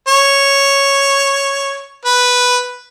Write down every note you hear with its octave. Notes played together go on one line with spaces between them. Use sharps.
C#5
B4